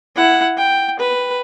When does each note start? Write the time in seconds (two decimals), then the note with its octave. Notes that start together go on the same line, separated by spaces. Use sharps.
0.16 E4 F#5
0.57 G5
0.99 B4